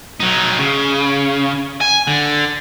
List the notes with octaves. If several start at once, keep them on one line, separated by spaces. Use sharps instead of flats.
F#3 D#4
C#3
G#5
D3